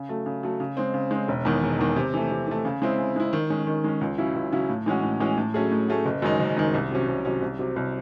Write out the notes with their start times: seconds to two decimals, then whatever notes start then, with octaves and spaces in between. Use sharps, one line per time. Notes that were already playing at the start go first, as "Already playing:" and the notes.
Already playing: C#3
0.09 F#3 A3
0.26 C#3
0.43 F#3 A3
0.60 C#3
0.77 G#3 C4
0.94 C#3
1.11 G#3 C4
1.28 E1
1.45 E2 D#3 G#3
1.63 E1
1.79 E2 D#3 G#3
1.96 C3
2.14 E3 A3
2.31 C3
2.47 E3 A3
2.65 C#3
2.82 G#3 C4 E4
2.98 C#3
3.16 G#3 C4 E4
3.33 D#3
3.50 G#3 C#4
3.67 D#3
3.84 G#3 C#4
4.01 C#2
4.18 C#3 F#3 C#4 E4
4.35 C#2
4.52 C#3 F#3 C#4 E4
4.69 A2
4.86 E3 G#3 C#4 F#4
5.03 A2
5.20 E3 G#3 C#4 F#4
5.38 A2
5.54 F#3 A3 C#4 G#4
5.71 A2
5.88 F#3 A3 C#4 G#4
6.06 F#1
6.22 F#2 D#3 G#3 D#4
6.40 F#1
6.57 F#2 D#3 G#3 D#4
6.74 C2
6.91 C3 F#3 C#4
7.08 C2
7.25 C3 F#3 C#4
7.42 C2
7.59 C3 F#3
7.76 C2